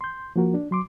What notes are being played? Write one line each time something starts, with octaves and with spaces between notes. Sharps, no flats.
C6 G6
F3 A#3 F#4 A#4
D4
F#3 C6 D6